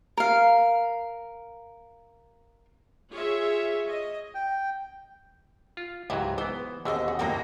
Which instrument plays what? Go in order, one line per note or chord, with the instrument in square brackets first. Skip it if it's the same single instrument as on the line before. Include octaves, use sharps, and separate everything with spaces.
[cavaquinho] A#4 F5
[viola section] F4 G#4 C#5 E5
D#5
[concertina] G5
[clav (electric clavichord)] F4
[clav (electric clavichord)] C#2 G#2 F#3 [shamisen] E4 G4
[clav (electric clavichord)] E3 B3 [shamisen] C5
[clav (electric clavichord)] D#2 B2 D3 [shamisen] C#4 G#4 C5 [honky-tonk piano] D#5 E6
[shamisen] F#4
[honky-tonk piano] G#1 F2 A#6 [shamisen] E3 A#3 C4